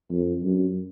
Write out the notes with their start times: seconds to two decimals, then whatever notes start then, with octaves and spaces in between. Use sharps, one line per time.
0.11 F2
0.44 F#2